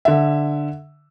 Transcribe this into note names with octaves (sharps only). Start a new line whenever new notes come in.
D3 E5